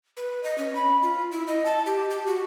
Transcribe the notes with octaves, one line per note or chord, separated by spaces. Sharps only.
B4
D#5
C#4
B5
F4
E4
D#5
A5
G4
G4
F#4